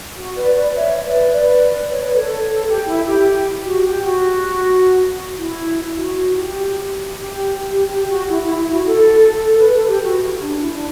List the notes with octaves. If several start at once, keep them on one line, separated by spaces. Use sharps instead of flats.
F#4
B4 D5
B4 D5
C#5 E5
B4 D5
B4 D5
C#5
B4
A4 C#5
A4
G4
E4
G4
F#4
G4
F#4
E4
F#4
F#4
G4
G4
G4
G4
F#4
E4
E4
E4
F#4
A4
A4
B4
A4
G4
F#4
E4
D4
E4
D4